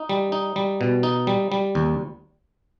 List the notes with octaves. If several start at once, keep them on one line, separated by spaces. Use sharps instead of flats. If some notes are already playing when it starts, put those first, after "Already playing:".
Already playing: D#4
G3
D#4
G3
B2
D#4
G3
G3
D#2